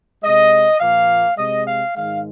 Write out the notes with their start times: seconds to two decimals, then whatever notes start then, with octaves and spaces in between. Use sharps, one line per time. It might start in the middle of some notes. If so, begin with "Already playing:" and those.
0.23 C3 G#3 D#5
0.80 A#2 F3 A#3 F5
1.38 C3 G#3 D#5
1.67 F5
1.96 G#2 D#3 G#3 F5